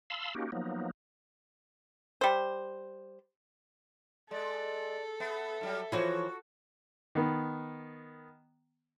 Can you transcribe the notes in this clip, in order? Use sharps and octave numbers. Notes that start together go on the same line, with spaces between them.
F5 A5 B5 C6 E6
A#3 C#4 D#4 F#4 G4
F3 F#3 A#3 B3 D#4
G3 C5
G#3 A4 D5
B3 E5
G#2 F#3 G3
E3 F3 F#4 C#5
D#3 B3